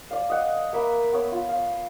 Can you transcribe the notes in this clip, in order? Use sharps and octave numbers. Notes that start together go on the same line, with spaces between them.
D5 F5
D#5 F#5
A#3 B4 E5
B3 C#5 E6
F4
F5